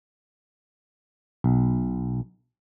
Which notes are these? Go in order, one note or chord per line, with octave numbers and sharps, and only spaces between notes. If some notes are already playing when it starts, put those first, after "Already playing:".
B1